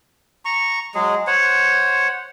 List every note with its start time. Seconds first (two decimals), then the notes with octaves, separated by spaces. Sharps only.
0.45 A#5 C#6
0.95 F#3 G#3 G#4
1.27 C5 C#5 F#5